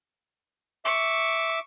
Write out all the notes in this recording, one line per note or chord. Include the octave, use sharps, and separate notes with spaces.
E5 C#6 D6